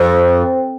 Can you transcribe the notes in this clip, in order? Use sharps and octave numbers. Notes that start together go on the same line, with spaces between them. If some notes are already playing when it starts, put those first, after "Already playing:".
Already playing: F2 C5